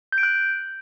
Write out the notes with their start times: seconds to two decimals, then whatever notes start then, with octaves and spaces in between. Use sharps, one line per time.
0.12 G6
0.18 D7
0.23 F#6